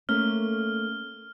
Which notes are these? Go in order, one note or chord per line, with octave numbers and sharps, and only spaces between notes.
A3 A#3 C#4 F6